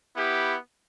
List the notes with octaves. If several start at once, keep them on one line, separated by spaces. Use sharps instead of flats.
B3 E4 G4